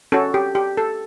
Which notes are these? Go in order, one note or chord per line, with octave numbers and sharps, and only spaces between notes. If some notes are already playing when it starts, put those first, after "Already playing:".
C#4 F#4 A4
G4
G4
A4